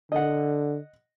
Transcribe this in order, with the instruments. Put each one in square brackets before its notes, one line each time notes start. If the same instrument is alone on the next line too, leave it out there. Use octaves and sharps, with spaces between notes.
[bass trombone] D3 [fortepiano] D#5 F#5